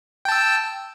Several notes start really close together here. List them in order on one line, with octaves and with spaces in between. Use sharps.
G5 A5 E6